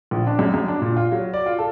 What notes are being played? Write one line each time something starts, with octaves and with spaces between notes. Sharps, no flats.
A#1
D4
F#2
F#2
D4
A#2
F4
F#3
D5
F4
A4